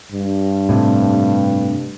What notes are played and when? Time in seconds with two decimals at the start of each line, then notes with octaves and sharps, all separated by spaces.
0.12 G2
0.69 A2 C3